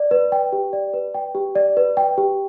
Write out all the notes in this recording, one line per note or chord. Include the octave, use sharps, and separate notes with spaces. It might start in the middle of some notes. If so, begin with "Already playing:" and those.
Already playing: D5
B4
G5
G4
D5
B4
G5
G4
D5
B4
G5
G4